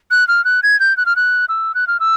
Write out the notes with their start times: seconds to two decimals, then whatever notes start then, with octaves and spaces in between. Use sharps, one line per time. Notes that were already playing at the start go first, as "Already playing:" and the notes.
0.11 F#6
0.28 F6
0.45 F#6
0.63 G#6
0.80 G6
0.97 F#6
1.06 F6
1.16 F#6
1.49 E6
1.75 F#6
1.87 F6
2.00 E6